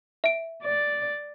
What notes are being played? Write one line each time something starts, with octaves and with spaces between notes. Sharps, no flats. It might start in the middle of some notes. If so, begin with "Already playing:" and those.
E5 D7
D5